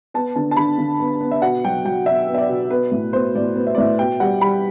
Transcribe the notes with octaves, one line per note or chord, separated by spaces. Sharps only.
B3 A5
D3 A5
A5
D3 B5
D3
B3
B3
E5
B2 F#5
F#3 G5
F#3 G5
B2 E5
B3
E5
D5
B2
B3 B4
A2
B3 C5
A2 D5
B3
E5
D5
A2 E5
B2 G5
G3 F#5
G3 B5